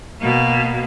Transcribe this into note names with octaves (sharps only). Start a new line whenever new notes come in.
B2 A#3